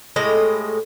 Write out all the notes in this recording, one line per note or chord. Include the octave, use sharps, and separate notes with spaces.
A2 G#3 G4 D#5